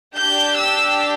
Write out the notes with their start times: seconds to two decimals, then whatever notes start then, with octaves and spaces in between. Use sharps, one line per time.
0.16 D4 G4 G6
0.57 E6